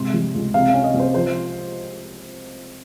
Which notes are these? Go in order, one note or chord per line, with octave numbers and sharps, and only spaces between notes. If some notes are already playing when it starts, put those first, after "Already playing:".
Already playing: G#2 C3 C6
G3
C#2
C3 F5
C#4 F5
D#5
C2
C5
F3 C5